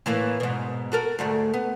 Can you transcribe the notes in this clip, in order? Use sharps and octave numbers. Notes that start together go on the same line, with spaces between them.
A2 E3 A#3
G#2 B2
F#4 A4 A#4
D2 G#2 A3
B3